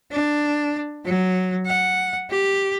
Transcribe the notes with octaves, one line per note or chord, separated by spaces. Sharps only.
D4
F#3
F#5
G4